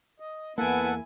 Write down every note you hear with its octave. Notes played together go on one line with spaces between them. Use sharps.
D#5
E2 A#3 B3 E4 A4 F#5 G#5